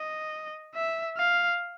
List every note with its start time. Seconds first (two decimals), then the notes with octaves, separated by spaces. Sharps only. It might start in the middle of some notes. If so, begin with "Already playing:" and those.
Already playing: D#5
0.75 E5
1.18 F5